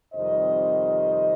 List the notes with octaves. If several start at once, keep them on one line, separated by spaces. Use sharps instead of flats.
F2 C3 D#3 G3 C5 D#5